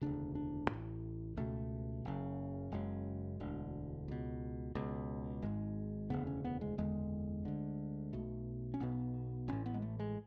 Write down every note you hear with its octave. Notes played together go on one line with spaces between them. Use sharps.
E1 D2 C#3 D4
D4
A1 A2
C#2 B2 A3
F#1 F#2 C#3
F#1 F#2 C#3 G#3
E1 D2 D3
C#2 B2
C#2 B2
G#1 G#2 G#3
E1 D2 C#3 B3
C#4
B3
G#3
F#1 E2 D3 G#3
D2 D3
B1 B2 A3
C#4
B1 B2 B3
A1 A2 C#4
B3
G#3
A3
G#3